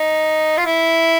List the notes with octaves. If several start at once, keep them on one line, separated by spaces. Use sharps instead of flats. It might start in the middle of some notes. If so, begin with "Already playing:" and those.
Already playing: D#4
F4
E4